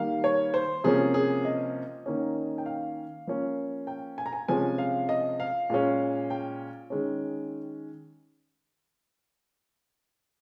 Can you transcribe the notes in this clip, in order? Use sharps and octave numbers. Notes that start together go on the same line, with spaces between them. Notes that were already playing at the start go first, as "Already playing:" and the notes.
Already playing: D#3 G3 A#3 F5
C#5
C5
C3 F3 A#3 C#4 G#4
G#4
D#5
D#3 A#3 C#4
G5
F5
F3 A#3 C#4
G5
G#5
A#5
G#5
C3 F3 G#3 C#4 G#5
F5
D#5
F5
A#2 G#3 C#4
G5
D#3 G#3 C#4